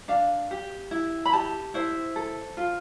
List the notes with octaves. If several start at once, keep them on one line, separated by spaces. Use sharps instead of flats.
D4 F5
G4
E4
B5
G4 A5
E4 C5
A4
F4